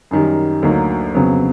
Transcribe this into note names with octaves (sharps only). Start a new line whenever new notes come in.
F#2 D#3 G3
D2 D3 F#3 A#3 D#4
F2 C#3 F#3 B3